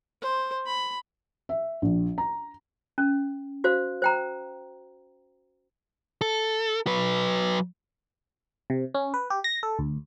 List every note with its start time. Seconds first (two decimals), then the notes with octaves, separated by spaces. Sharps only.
0.22 C5
0.66 B5
1.49 E5
1.82 A#1
2.18 A#5
2.98 C#4
3.64 F#4 C5 F5
4.02 C5 G5 A#5
6.21 A4
6.87 F#3 B4
8.70 C3
8.95 C#4
9.14 B4
9.30 G4
9.44 A#6
9.63 A4
9.79 D2